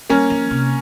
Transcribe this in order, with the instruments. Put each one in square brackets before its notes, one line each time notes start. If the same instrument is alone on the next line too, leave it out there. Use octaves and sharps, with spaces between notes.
[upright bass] G3 [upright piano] A#3 C#4
[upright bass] F3
C3